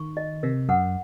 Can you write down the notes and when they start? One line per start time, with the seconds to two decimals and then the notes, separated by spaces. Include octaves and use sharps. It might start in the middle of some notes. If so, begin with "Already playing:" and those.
Already playing: D#3 C#6
0.17 D#5
0.43 C3 A#4
0.69 F#2 F#5